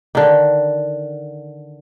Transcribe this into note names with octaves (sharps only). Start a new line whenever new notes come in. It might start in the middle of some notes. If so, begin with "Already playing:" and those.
D3 D#3